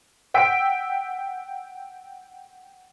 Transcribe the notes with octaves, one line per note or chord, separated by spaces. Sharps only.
F#5 G5 E6 B6 D7